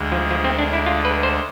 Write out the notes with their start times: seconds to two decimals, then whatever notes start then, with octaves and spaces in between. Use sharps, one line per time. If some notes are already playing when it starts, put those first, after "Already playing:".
Already playing: D2 D3 G#3
0.12 F3
0.30 F3
0.45 C4
0.59 D4
0.73 E4
0.86 F4
1.05 B4
1.23 C5